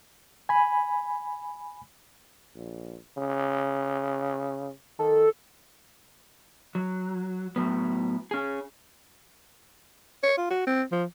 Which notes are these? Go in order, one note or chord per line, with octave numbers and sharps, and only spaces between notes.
G#5 B5
A#1
C#3
D#3 A4
F#3
A2 F#3 B3
C#4 G#4
C#5
F4
F#4
C4
F3